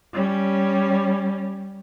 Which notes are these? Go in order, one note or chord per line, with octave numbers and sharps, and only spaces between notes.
G3 C#4